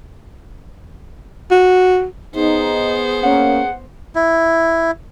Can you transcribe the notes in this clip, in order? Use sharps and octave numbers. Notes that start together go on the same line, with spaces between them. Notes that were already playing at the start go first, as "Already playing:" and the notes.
F#4
B3 D#4 G#4 C5
A#3 C#4 F#5
E4